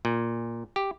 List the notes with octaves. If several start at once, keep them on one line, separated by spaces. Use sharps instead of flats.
A#2
G4